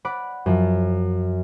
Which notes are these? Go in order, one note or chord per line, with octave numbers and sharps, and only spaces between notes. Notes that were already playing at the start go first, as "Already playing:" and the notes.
D5 F#5 B5
F#2 F3